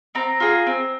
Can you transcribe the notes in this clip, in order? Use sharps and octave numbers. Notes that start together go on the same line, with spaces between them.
C4 A#5
F4 G#4
C4